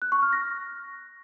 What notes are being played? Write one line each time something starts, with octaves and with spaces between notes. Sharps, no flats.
F#6
C#6
F6
A#6